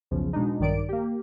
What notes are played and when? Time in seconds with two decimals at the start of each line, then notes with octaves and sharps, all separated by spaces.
0.11 B1 E2 C#3 F3
0.33 B2 G#3 D4 D#4
0.60 A#1 G2 D#3 D5 D7
0.89 A#3 G4